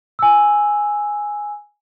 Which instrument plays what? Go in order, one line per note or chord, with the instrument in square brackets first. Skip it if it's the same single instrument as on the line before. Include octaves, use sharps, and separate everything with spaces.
[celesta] G#5 E6